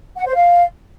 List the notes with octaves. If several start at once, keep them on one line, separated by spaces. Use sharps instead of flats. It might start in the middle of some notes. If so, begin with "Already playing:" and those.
F#5
C5
F5